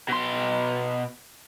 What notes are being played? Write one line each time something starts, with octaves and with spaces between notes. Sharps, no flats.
B2 C6